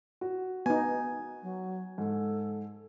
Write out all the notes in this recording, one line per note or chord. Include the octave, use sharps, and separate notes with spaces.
F#4
B3 D#4 G#5
F#3
G#2 A4